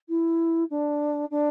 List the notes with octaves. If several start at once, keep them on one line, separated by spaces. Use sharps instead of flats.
E4
D4
D4